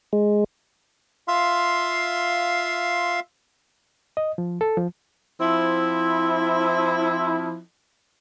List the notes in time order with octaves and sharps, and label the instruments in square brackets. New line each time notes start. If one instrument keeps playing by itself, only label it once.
[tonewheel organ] G#3
[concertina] F4 E5 F5 C6
[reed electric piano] D#5
F3
A4
F3
[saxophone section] F3 C4 E4